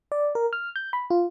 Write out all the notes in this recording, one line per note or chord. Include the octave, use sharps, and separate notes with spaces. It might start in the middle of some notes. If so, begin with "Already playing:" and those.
D5
A#4
F6
G6
B5
F4